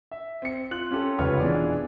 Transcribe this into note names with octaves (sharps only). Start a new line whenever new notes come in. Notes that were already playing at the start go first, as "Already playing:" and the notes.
E5
C4 C#7
F4 F#6 F#7
C#4 F4 G4 A4
F1 C#2 F4 B4 C#5 F6
B2 E3 B3 D4 G#4 D5